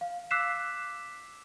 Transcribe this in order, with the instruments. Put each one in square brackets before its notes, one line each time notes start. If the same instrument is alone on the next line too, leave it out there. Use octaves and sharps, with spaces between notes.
[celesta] F5
D6 E6 F#6 B6 C7 E7